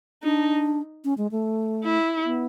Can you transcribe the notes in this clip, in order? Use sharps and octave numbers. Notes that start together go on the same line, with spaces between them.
D4 D#4
C#4
G#3
A3
E4
B3